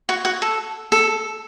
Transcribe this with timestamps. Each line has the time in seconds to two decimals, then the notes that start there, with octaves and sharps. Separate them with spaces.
0.09 F#4
0.25 F#4
0.42 A4
0.92 A4